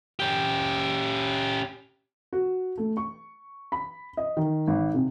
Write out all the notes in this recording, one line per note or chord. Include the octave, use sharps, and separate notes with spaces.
C#4 G4
F#4
A3
C#6
B5
D#5
D#3
G#1
C3